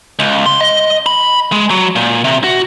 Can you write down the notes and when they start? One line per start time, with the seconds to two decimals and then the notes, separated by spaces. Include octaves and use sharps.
0.19 C#2
0.46 C6
0.61 D#5
1.06 B5
1.52 G#3
1.70 F#3
1.96 A#2
2.24 C3
2.44 F#4